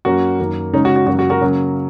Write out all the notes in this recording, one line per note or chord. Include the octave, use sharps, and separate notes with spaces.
F#2 F#3 A#3 C#4 F#4
F#2 D#3 A#3
C#3 G#3 C#4 D#4
F#4
F#4
F#2 C#3 A#3 C#4 F#4
F#4
F#4 A#4
C#3 F#3 A#3 C#4